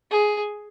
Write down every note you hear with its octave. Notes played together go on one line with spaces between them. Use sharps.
G#4